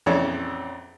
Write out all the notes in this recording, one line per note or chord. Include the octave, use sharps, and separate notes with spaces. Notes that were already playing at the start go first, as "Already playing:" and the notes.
A#1 F2 C#3 E3 C#5 D5